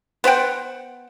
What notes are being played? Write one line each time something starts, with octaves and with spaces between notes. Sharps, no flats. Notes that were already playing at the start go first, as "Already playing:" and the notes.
B3 C5 F#5 G5